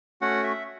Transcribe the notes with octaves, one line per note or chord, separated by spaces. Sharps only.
A3 C#4 F#4 F#5
E5